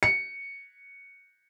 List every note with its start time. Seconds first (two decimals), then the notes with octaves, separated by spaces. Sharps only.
0.03 C#7